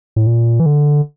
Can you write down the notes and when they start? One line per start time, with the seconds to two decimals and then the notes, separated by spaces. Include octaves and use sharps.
0.16 A2
0.27 A#2
0.60 E3
0.66 D3